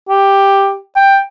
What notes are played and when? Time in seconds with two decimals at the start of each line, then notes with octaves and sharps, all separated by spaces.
0.09 G4
0.96 G5